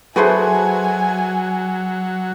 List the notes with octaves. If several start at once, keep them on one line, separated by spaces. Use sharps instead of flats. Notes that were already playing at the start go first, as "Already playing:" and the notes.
F#3 E4 F#4 G#4 A4 B4 C5 G#5